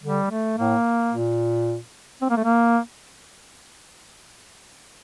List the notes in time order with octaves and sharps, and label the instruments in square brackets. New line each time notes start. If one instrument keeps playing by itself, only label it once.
[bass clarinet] D3 [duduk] G3
[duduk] A3
[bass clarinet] A2 [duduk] A#3
[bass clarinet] A#2
[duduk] C4
A#3
A3
A#3